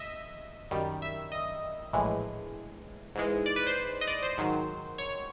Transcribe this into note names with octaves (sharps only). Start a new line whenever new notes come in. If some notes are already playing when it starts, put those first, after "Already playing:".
Already playing: D#5 E5
F#2 D#3 G3
E5
D#5
A#1 A2 E3 G#3
G#2 E3 G#3
D5
B4
C5
D#5
D5
C5
G#2 D#3 F#3
C#5